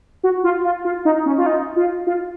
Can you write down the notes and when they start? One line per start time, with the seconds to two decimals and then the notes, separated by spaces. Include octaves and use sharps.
0.24 F#4
0.44 F4
0.65 F4
0.85 F4
1.05 D#4
1.26 C#4
1.38 F4
1.46 D#4
1.76 F4
2.07 F4